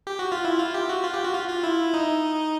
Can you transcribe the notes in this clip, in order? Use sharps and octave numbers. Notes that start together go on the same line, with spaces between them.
G4
F#4
F4
E4
F4
G4
F#4
F4
G4
F#4
F4
F4
E4
D#4